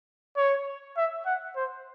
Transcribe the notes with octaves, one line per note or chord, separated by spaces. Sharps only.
C#5
E5
F#5
C5